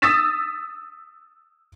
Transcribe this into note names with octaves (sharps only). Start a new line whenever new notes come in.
D#6 E6 A6 B6 E7